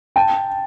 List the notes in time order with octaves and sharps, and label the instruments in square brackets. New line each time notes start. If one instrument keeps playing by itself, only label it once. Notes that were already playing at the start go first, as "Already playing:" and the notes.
[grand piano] G5 A5